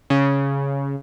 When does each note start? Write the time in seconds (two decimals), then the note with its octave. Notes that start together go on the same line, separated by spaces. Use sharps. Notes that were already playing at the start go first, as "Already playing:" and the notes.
0.10 C#3